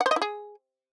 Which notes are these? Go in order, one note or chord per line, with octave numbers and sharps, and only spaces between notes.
F#5
C5
D#5
E4
G#4